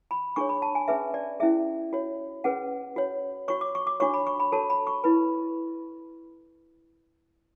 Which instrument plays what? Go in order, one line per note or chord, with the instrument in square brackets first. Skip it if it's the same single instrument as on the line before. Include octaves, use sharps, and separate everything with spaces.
[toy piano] B5
D4 G#4 C#5 C#6
B5
A5
G#5
C#4 G#4 B4 E5
D5
C#4 E4 G#4 E5
F#4 C#5
C#4 G#4 B4 F#5
F#4 C#5
F#4 C#5 C#6
D6
C#6
D6
D4 F#4 C#5 C#6
B5
C#6
B5
F#4 A4 C#5 A5
B5
C#6
E4 B4 B5